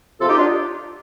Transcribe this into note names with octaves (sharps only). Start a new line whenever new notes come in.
C3 F3 F4 A4
D#4 G4
D4 F4